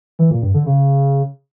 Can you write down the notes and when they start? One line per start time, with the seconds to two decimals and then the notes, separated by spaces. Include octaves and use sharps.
0.19 E3
0.31 A#2
0.42 G2
0.54 D3
0.66 C#3